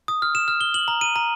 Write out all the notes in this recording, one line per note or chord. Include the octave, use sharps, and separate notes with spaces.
D#6
F6
E7
F6
G7
F#7
A#5
D#7
A#5